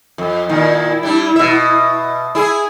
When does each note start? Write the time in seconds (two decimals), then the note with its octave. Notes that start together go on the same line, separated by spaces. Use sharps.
0.18 F2
0.49 A#2 D#3 E4
1.03 G3 D4
1.36 B2 E5
2.35 E4 G#4